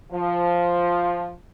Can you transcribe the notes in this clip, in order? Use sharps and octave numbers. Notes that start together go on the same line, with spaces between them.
F3